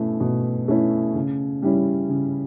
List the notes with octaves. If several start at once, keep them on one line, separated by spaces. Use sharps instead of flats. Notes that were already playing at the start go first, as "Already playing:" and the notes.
Already playing: B2 A3 C#4 E4
B2
A3 C#4 E4
C#3
G3 C#4 E4
C#3